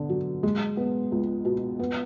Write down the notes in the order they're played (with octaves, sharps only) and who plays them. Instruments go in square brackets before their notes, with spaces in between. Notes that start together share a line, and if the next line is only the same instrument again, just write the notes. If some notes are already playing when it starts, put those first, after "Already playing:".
Already playing: [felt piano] D3 B3
F#3
G#3
B3
C#2
B2
B3